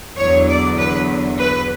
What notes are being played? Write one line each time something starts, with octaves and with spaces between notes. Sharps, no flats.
E2 D3 F#3 C#5
D5
B4
B4